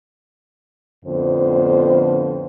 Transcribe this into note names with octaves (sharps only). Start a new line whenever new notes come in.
F2 A2 D3 B3 C5